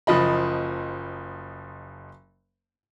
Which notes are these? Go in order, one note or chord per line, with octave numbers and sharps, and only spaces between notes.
F#1 F3 D#5 B5